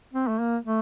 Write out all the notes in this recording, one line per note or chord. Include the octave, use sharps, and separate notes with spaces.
C4
A3
A#3
A3